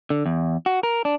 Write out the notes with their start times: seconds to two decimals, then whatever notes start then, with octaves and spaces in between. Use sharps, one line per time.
0.10 D3
0.26 E2
0.66 F#4
0.83 A#4
1.05 D4